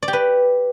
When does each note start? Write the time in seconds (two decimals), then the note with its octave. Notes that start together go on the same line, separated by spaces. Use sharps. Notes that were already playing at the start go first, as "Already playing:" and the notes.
0.03 D5
0.08 G4
0.13 B4